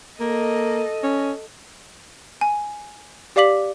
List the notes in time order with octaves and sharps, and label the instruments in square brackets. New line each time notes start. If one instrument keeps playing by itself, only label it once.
[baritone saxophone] A#3 [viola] A4 D#5
[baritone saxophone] C#4
[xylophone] G#5
G4 D5 F5 D6 B6 F#7